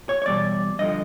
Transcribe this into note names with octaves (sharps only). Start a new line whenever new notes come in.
C#5
C#5
E2 B2 G3 D5
G2 D3 F3 D#5